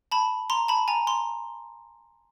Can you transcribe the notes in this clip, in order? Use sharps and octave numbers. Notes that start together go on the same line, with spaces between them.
A5 B5
A#5 C6
A5 B5
G#5 A#5
A#5 C6